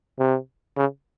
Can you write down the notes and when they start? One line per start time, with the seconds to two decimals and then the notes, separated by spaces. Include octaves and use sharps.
0.19 C3
0.77 C#3